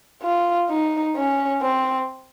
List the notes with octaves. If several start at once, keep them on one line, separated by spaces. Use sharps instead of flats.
F4
D#4
C#4
C4